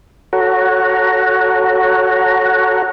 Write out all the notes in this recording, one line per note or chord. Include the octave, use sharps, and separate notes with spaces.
F#4 A4 C#5 F#5 A#5